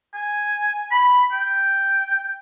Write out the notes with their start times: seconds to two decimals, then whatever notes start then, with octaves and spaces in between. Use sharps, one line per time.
0.14 G#5
0.91 B5
1.32 G5